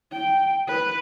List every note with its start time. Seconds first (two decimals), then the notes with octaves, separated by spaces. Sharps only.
0.12 G5
0.67 B4